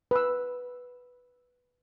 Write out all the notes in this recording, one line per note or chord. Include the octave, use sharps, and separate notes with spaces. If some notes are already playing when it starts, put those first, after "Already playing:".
B4 E6